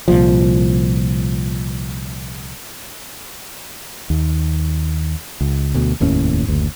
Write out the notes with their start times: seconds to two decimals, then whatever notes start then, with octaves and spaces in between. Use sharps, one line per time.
0.08 C2 A#2 F3
4.10 D#2
5.41 C#2
5.74 D2 B2
6.00 F1 D#2 A2 C#4
6.47 F#1 D2